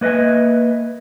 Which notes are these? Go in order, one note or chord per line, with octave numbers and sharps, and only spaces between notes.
A#3 B4 D#5 E5 G#5